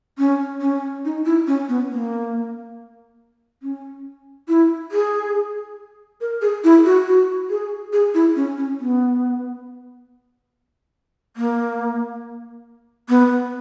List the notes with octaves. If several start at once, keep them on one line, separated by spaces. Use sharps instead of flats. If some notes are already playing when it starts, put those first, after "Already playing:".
C#4
C#4
D#4
E4
C#4
B3
A#3
C#4
E4
G#4
A#4
G#4
E4
F#4
F#4
G#4
G#4
E4
C#4
C#4
B3
A#3
B3